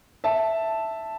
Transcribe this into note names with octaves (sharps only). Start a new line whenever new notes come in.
E5 A5